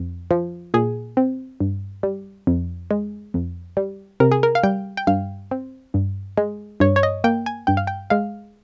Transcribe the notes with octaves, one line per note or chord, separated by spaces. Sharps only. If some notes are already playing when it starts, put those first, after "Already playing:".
Already playing: F2
F3
A#2 G#4
C4
G2
G3
F2
G#3
F2
G3
C3 A#4
G#4
A#4
F5
G3 G5
G5
G2 F5
C4
G2
G#3
G2 C#5
C#5
D#5
A#3 G5
G#5
G2 G5
F5
G5
G#3 F5